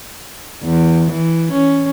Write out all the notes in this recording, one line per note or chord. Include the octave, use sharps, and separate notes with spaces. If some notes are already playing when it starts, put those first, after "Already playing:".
E2
E3
C#4